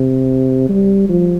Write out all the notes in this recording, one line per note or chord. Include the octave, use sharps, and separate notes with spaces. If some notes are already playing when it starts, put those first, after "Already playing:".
Already playing: C3
G3
F3